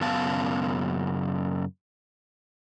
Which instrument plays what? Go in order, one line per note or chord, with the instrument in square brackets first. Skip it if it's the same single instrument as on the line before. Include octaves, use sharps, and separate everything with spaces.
[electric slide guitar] F#2 C#3 B3 F5 A5